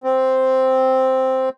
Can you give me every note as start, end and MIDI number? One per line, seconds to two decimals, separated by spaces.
0.04 1.49 60